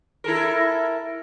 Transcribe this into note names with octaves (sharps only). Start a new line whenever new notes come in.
E4 A4 A#4